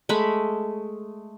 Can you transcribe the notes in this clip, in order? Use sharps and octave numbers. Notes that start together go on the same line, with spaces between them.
G#3 A3 B5